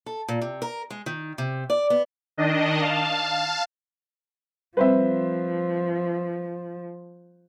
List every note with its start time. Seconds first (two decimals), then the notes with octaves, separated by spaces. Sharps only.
0.06 A4
0.28 A#2
0.41 C3
0.62 A#4
0.91 G#3
1.06 D#3
1.38 C3
1.70 D5
1.90 B3
2.37 D#3 D4 D#5
2.81 F5 A5
4.77 F3 G3 C4 B4 C5 E5